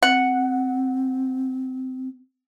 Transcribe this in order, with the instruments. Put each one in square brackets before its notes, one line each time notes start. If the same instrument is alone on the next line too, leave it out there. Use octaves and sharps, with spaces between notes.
[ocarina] C4 [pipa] F#5